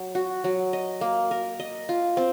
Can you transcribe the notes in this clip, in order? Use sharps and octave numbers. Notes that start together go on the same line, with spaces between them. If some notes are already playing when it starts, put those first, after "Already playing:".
Already playing: F#3
F#4
F#3
D#5
A#3
A#4
D#5
F4
C4